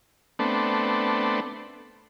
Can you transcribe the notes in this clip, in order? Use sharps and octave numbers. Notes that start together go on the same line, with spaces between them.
A3 B3 C4 D4